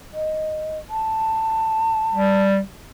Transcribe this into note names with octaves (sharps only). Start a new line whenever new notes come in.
D#5
A5
G3